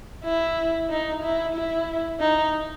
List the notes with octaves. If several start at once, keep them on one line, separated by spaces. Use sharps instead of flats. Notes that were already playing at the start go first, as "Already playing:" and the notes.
E4
D#4
E4
E4
D#4